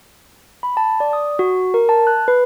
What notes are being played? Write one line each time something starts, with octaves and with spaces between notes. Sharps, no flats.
B5
A5
D5
D#6
F#4
A#4
A5
F#6
B4